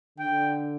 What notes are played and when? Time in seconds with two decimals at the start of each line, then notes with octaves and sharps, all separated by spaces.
0.19 D3 G5